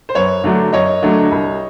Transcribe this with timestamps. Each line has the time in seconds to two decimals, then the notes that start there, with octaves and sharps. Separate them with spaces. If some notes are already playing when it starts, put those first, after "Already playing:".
0.09 C5
0.15 F#2 B4 C#5
0.44 D3 F#3 A3 D4
0.72 F#2 C#5 D#5
1.02 D3 F#3 A3 D4
1.31 C2